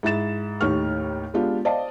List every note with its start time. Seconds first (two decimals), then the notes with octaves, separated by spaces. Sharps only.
0.03 G#2 E4 G#4 A6 E7
0.61 D#2 A2 D#4 G4 C#6 F6
1.34 G#3 B3 D4 F4 G4
1.65 C5 D5 D#5 F5 A5